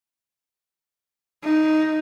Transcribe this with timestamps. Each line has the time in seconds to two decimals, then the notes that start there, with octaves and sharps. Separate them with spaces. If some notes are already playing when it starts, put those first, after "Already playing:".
1.44 D#4